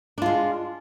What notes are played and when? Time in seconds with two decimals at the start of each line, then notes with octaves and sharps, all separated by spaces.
0.18 D4
0.22 F4
0.26 G#3